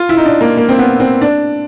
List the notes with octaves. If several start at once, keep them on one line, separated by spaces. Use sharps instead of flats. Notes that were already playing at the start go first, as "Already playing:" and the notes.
Already playing: F4
E4
D#4
D4
A#3
A#3
C4
B3
C4
D4